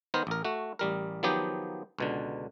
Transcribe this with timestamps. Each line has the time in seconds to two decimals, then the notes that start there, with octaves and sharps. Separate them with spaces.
0.14 D#3 B3 A#4 C5
0.27 A1 A#4
0.45 A3 F#4
0.79 A1 G3 A#4
1.23 D#3 F3 F#3 B3 D#4 G4
1.99 C#2 B2 D3